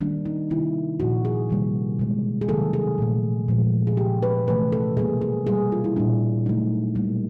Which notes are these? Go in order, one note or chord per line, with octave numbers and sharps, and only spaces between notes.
D#3 G3 A#3 D4
D#4
C3 D#3 G3 A#3 E4
A#2 F3 A#3 F#4
G#4
C3 D#3 G3 A#3
B2 G#3
G#4
C3 D#3 F#3 A#3 A4
G#4
A#2 F3 A3
A#2 F3 G#3
G#4
C#3 F3 A#3 G4
B4
C3 E3 A3 B4
A4
B2 G3 A#3 G#4
G#4
B2 G3 A#3 G#4
F4
E4
A#2 G3 A#3 D4
C#3 F#3 A3 D#4
B2 G3 A#3